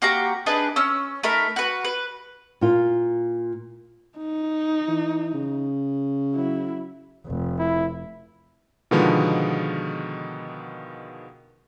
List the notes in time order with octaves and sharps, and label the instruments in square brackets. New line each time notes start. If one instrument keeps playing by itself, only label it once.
[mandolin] A#3 F#4 G4 A#5
D4 D#4 G#4 B4
C#4 E6
A3 D#4 A#4 B5
F#4 B4
B4
[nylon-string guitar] A#2 F4
[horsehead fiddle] D#4
[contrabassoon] E3
C#3
[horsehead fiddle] F#3 E4
[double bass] F1
[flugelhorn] E4
[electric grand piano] B2 D3 D#3 F3 G#3 B3